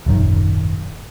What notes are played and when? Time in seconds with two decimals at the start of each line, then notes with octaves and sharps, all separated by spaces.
0.06 D#1 G#1 F#2 D#3